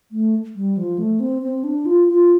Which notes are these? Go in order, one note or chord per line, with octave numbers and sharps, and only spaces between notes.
A3
G3
F3
A3
C4
C4
D4
F4
F4